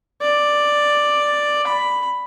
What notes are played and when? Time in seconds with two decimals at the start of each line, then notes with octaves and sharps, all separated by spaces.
0.21 D5
1.67 B5